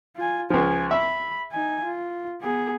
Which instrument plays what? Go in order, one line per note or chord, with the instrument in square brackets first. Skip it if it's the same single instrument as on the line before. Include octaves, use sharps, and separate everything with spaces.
[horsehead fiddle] F4 G#5
[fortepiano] C#2 F3 [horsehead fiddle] G#5
[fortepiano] E5 [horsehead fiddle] B5
[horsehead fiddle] D#4 G#5
F4
B3 G#4